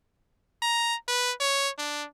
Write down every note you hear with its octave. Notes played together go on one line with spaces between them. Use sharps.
A#5
B4
C#5
D4